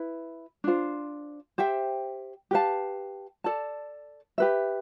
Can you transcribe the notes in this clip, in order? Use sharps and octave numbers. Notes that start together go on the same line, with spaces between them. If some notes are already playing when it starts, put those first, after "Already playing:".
Already playing: E4 B4
D4 F4 C5
G4 C5 E5 G5
G4 B4 F5 A5
A4 D5 A5
G4 B4 E5